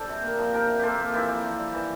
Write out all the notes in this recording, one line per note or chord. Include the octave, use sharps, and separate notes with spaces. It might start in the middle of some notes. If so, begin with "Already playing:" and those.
Already playing: G3 D4 A4 C5
C3
A#3
F3
D4 G4 A#4
C3
A#3 F4 G4 A4
F3
E3 E4 G4
E3
C4
G3
E3